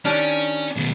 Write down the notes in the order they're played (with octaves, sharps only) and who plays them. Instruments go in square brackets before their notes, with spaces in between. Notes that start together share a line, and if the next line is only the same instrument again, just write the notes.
[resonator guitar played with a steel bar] D#3 D4 G4 [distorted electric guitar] C#4
[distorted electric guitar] D#2 B2